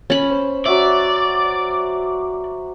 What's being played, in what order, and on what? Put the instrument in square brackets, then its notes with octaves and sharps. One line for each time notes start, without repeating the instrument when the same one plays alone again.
[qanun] C#4 B5
[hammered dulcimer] C5
[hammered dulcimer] F#3 F#4 E5 [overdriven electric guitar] D5